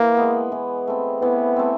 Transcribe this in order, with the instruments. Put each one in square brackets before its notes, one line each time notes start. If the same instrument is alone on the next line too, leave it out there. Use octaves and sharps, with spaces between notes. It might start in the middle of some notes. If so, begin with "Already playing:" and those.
Already playing: [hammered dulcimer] E3 [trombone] A#3
[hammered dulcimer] G#3 B3
E3
A3 C4
[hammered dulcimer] E3 [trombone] B3
[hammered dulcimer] A3 C4